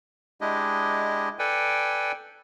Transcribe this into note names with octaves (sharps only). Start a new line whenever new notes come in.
G#3 D4 E4 G4 D#5
A4 B4 D5 G5 G#5